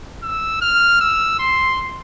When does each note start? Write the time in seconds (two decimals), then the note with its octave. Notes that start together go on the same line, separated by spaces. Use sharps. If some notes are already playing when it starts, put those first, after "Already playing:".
0.23 E6
0.61 F6
1.01 E6
1.39 C6